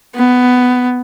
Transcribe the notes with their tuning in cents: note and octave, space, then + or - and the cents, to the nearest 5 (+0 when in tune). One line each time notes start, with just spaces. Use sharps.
B3 +10